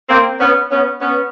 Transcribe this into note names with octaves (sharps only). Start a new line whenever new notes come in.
A#3 C4
B3 C#4
B3 C#4
B3 C#4